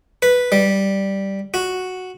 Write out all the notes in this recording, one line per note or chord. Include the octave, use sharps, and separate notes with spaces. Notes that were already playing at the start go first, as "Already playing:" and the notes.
B4
G3
F#4